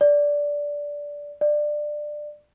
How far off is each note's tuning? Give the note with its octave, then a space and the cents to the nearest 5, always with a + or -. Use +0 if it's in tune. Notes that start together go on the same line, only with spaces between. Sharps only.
D5 -10
D5 +20